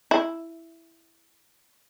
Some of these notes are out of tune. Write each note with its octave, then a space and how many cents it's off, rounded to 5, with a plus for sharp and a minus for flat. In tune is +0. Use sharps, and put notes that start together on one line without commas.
E4 +5